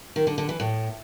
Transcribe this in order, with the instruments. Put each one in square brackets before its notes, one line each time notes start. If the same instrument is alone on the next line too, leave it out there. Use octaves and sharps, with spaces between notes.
[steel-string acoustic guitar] D#3
D3
D3
E3
A2